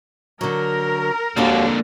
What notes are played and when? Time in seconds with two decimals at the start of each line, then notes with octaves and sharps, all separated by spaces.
0.41 D3 F#3 A#4
1.37 D#2 A#2 D3 A#3 D4 F#4